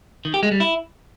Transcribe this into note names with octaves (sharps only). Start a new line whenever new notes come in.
D#3
G4
G#3
G3
E4